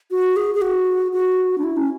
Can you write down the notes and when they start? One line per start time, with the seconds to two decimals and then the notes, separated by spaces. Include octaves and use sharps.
0.11 F#4
0.36 G#4
0.54 G#4
0.62 F#4
1.13 F#4
1.58 D4
1.64 E4
1.77 C#4